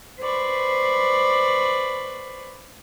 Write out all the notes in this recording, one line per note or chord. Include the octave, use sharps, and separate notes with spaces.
B4 C5 D5 B5 C#6